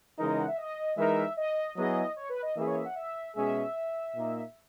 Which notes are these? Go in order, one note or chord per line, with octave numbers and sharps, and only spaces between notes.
C#3 E3 G#3 D#4 A#4 D#5
D#5
F#5
E5
D#5
E3 G#3 D#4 A#4 E5
D#5
F#3 B3 E4 G#4 D#5
C#5
B4
D#5
E3 A#3 C#4 G#4 E5
C#5
E5
F#5
E5
B2 G#3 C#4 G#4 E5
A#2 A#3 D#4